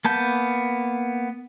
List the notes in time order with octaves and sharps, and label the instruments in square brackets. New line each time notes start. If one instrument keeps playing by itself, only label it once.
[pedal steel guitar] A#3 B3 A5 G6